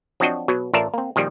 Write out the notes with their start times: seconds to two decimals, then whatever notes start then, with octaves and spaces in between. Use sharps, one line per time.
0.20 F3 F#3 C4 D4 F#4 D#5
0.48 B2 F#3
0.73 A1 F4 A#4 D5 E5 A5
0.94 A#3 C4
1.16 A#2 D#3 F3 G3